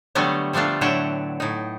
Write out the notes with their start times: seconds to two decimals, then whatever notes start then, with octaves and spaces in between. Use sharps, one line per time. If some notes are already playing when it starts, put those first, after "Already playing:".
0.15 D3 F#3 G3 A3 B3 G4
0.53 F3 G3 A3 D4 F4
0.81 A2 D3 F#3 E5 F#5 G5
1.40 A2 D#4